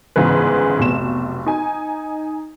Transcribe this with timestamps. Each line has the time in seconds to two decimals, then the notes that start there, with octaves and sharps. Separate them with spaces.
0.16 G1 G#2 C#3 E3 B4
0.79 F1 B1 E7
1.46 D#4 G#5